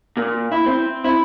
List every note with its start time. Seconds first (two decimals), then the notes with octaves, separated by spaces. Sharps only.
0.17 A#2
0.52 E4
0.66 C4
1.04 E4